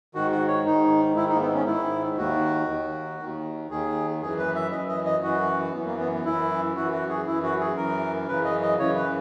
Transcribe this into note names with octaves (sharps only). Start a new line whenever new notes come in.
G#2 D#3 F#4
F#4
C#5
G#2 D#3 D#4
G#2 D#3 E4
D#4
A#3
B3
C#4
G#2 D#3 E4
D#2 D#3 F#4
D#2 D#3
D#2 D#3
D#2 D#3 G#4
F#2 E3 G#4
B4
E5
F#2 E3 D#5
D#5
D#5
F#2 E3 F#4
F#2 E3 B3
A#3
B3
F#2 E3 E4
F#2 E3 F#4
F#4
G#4
F#2 E3 E4
F#4
G#4
F#2 E3 A#4
F#2 C#3 E3 B4
D#5
D#5
F#2 C#3 E3 C#5
B4